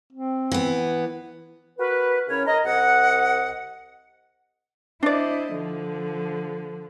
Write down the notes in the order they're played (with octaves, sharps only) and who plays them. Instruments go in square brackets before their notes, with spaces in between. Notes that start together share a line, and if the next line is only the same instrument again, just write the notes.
[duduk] C4
[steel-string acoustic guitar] E3 B3
[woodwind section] F#4 A#4 B4
C#3 C#4 E4 A#4 C#5
A#4 D#5
C2 D#5 F#5
[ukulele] D4 D5 [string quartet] E4 C5 D#5
[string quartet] D3 F3